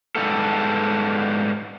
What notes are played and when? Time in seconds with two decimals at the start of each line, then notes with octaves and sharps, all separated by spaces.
0.15 G#2 G3 B3 A4